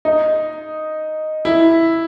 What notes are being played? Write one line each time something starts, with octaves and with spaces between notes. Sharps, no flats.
D#4
E4